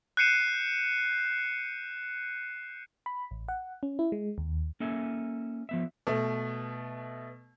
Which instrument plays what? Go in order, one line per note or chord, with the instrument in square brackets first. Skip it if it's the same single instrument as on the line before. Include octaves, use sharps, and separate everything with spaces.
[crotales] F#6 G6 C7 C#7 D#7 E7
[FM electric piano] B5
A1
F#5
C#4
E4
G#3
D#2
[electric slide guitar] A#3 C#4 A4 E5 G#5
F3 B3 E5
[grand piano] B2 A3